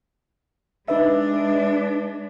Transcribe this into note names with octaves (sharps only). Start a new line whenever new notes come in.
G#3 D4 D#4 B4 E5